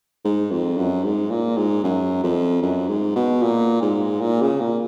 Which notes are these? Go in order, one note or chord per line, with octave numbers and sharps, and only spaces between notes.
G#2
F2
F#2
G#2
A#2
G#2
F#2
F2
F#2
G#2
B2
A#2
G#2
A#2
C#3
A#2